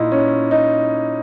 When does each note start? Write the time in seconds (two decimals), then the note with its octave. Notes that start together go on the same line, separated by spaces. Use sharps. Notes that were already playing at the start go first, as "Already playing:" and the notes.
Already playing: A#2 D#4 E4
0.12 C#4
0.51 D#4